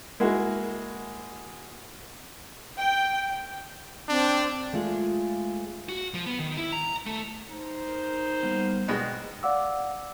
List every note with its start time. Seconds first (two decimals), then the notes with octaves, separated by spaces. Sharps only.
0.20 G#3 A#3 E4 F#4 G#4
2.80 G5
4.09 C4 D4
4.73 G#3 A3 F4 G#4
5.89 F#4
6.14 F3
6.26 B3
6.39 D#3
6.57 E4
6.72 A#5
7.06 A3
7.50 D#4 C5
7.88 A#4
8.43 G3 A#3 B3
8.88 B2 G#3 D5 G5
9.43 D5 F5 F#5 D6 E6